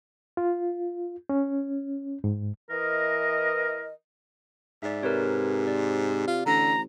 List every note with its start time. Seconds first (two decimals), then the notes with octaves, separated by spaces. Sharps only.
0.37 F4
1.30 C#4
2.24 G#2
2.71 E3 A#4 D#5
4.83 G#2 D5 E5
5.03 C3 A#4 B4 C#5
5.67 D5
6.27 F4
6.46 A1 D3 A#5